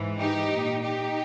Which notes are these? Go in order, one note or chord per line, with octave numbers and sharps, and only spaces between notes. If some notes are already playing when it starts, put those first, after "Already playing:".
Already playing: G#2 E3
D#4 G4
A#2
D#4 G4